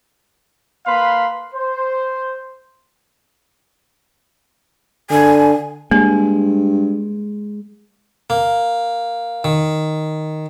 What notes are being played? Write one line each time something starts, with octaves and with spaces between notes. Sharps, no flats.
A#3 B4 F5 B5 C6
C5
D3 G#5
G2 G#3 A#3
A#3
D#3